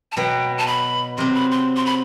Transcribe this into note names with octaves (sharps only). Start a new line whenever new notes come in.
A5
B2 F#3 B3 G5
A5
B5
C3 F#3 C4 C6
B5
C6
C6
B5